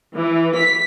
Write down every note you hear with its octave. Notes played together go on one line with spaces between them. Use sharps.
E3
B6